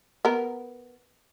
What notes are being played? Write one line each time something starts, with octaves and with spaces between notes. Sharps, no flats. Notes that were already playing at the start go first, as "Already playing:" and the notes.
B3 A#4